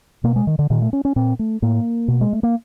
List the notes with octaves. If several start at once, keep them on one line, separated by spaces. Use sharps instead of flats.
B2 A#3
G#3
D#3
D3
A#2 D#3
A3
C#4
C#4
A#2 C4
A3
A2 A#3
B2
G#3
A3
A#3